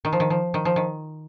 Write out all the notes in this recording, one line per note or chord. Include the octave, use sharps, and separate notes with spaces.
D#3
F3
D#3
F3
D#3
F3
D#3